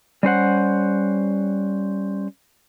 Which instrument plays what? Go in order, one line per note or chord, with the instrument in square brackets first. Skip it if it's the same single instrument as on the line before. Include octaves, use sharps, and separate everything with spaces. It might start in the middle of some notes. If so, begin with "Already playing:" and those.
[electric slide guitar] G3 C#4 C5 F#5